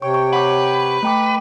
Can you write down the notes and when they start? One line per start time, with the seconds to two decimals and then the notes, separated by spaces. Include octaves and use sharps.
0.02 C3 C#5 G5 C#6
0.14 C#6
0.33 B4 F#5 D6
1.03 A3 G5 D6